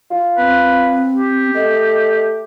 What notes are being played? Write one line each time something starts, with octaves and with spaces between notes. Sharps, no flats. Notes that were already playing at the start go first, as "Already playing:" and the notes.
F4
C4 B4
G4
A3 D#5